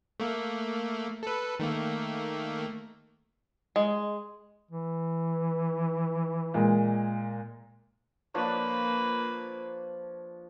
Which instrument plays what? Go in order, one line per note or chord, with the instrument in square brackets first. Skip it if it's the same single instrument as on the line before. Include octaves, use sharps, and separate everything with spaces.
[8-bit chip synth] A3 A#3
A4 B4
D#3 A3 A#3
[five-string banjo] G#3
[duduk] E3
[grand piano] A#2 G#3
[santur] F3 D4 C#5 [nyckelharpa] A#3 B4